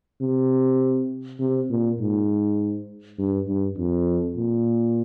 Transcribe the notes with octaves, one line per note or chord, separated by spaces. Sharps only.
C3
C3
A#2
G#2
G2
G2
F2
A#2